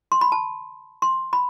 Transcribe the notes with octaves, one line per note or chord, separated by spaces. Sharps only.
C6
B5
A5
C6
B5